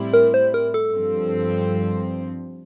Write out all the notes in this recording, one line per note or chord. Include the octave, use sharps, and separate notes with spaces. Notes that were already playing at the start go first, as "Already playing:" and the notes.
Already playing: A2 G3 C4 E4
A#4
C5
A#4
A4
G2 F3 C4